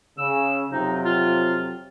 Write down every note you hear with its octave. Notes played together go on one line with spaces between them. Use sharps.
C#3 E6
F2 C3 F#3 D#4
F4